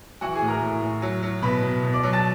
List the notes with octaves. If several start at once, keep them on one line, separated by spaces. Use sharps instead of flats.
E3 F#4 F#5
G#4 G#5
A2
A#4 A#5
A2
A2
F#3
F#3
B2 B4 B5
B2
B2
D5 D6
F#3
A5 A6